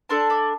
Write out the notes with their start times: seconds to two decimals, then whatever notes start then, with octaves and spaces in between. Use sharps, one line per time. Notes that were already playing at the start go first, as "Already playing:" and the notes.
0.09 D4 A4 A5 C6
0.30 B5 D6